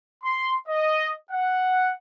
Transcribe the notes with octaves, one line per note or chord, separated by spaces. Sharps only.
C6
D#5
F#5